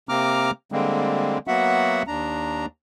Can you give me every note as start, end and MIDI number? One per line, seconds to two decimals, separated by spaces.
0.09 0.51 48
0.09 0.51 58
0.09 0.51 60
0.09 0.51 82
0.09 0.51 86
0.09 0.51 89
0.72 1.38 50
0.72 1.38 55
0.72 1.38 56
0.72 1.38 58
0.72 1.38 60
1.47 2.03 54
1.47 2.03 58
1.47 2.03 59
1.47 2.03 66
1.47 2.03 76
1.47 2.03 78
2.07 2.66 39
2.07 2.66 62
2.07 2.66 82